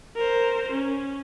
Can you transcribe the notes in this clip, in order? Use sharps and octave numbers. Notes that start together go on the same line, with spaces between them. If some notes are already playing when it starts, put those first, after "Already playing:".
A#4 C5
C#4